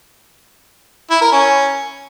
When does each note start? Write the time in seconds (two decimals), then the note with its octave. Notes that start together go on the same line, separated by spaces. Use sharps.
1.10 E4
1.22 A#4
1.33 C#4